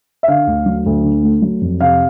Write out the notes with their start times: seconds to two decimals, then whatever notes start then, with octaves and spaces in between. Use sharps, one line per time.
0.23 E5
0.28 D3 F5
0.47 D2
0.66 F#3
0.86 D2
1.04 D3
1.23 A3
1.42 F#3
1.61 F2
1.81 C3 F5